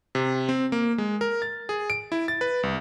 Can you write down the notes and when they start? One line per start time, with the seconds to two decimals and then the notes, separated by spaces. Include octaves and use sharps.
0.15 C3
0.49 C4
0.72 A#3
0.98 G#3
1.21 A#4
1.42 A6
1.69 G#4
1.90 D7
2.12 E4
2.28 A6
2.41 B4
2.63 C2